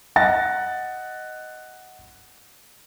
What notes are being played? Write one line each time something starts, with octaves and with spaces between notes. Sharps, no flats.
D#5 F#5 A6 A#6